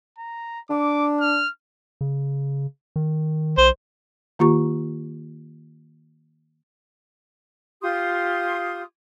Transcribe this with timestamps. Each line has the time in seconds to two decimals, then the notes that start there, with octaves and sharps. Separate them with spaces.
0.18 A#5
0.70 D4 D6
1.20 F6
2.01 C#3
2.96 D#3
3.58 B1 C5
4.39 D#3 A#3 F4 G4 A#5 C#6
7.81 F4 G4 C6 D#6